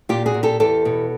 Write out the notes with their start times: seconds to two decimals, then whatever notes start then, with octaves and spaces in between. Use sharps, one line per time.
0.09 A#2 F4 G4
0.26 F#4 G#4
0.34 A#2
0.43 G4 A4
0.60 E2 G4 A4
0.85 B2